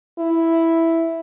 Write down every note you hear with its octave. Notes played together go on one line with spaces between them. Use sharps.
E4